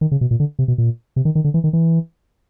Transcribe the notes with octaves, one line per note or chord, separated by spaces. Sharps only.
D#3
C#3
B2
A#2
D3
C3
B2
A#2
C3
D#3
D#3
D3
E3
D#3
E3